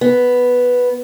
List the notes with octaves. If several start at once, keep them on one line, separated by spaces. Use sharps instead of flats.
B3